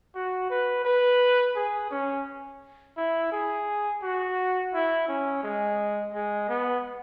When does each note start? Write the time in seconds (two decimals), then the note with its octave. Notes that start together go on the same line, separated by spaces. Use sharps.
0.15 F#4
0.50 B4
0.85 B4
1.56 G#4
1.91 C#4
2.97 E4
3.32 G#4
4.03 F#4
4.73 E4
5.08 C#4
5.43 G#3
6.14 G#3
6.49 B3